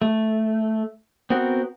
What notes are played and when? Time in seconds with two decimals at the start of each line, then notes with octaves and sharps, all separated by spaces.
0.02 A3
1.30 B3 C4 F#4 A#4